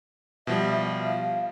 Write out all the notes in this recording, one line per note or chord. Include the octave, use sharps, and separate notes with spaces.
B2 F3 G3 E5
F5